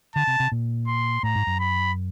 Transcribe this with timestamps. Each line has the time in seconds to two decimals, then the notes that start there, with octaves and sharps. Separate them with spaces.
0.16 D3 A5
0.27 C3
0.40 C3
0.52 A#2
0.87 C6
1.23 A2 A#5
1.35 G#2
1.47 F#2
1.59 B5